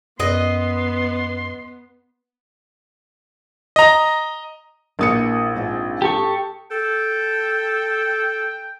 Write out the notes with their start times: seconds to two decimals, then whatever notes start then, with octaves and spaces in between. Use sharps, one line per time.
0.20 F#2 B3 B4 D#5 C6
3.76 D#5 A#5
4.99 A#1 A#3 E4 D#6 C#7
5.55 G#2 C4 F4
6.02 G4 A4 C#6
6.71 A4 G5